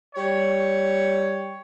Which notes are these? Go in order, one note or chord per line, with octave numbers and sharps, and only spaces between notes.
G3 C#5